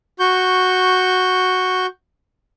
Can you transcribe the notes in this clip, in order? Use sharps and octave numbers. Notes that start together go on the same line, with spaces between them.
F#4 C#6 G6